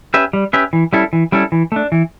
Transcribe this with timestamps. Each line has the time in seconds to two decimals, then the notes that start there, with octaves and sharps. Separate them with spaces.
0.14 C#4 G4 B4 E5
0.33 G3
0.53 C#4 G4 B4 E5
0.73 E3
0.93 G3 C#4 E4 A4
1.13 E3
1.32 G3 C#4 E4 A4
1.52 E3
1.72 A3 D4
1.92 E3